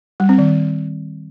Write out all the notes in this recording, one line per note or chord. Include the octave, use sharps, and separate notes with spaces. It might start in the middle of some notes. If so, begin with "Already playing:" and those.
G3
C4
D#3